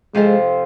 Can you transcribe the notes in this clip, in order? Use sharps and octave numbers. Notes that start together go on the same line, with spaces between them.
F2 C3 F3 G#3 C4 F4